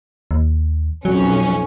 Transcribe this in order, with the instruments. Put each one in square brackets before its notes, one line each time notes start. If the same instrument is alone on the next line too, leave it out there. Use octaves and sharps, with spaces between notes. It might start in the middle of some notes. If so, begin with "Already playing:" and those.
[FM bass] D#2
[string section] B1 F2 C#4 [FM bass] F#3